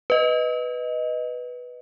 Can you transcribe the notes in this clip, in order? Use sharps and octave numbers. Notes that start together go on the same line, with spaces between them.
B4 D#5